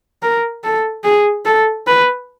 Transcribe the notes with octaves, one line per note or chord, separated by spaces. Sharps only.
A#4
A4
G#4
A4
B4